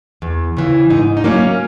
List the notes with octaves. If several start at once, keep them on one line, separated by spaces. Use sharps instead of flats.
E2
C#3 E3
G#2 D#4
D#4
F#3 A#3 C#4 E4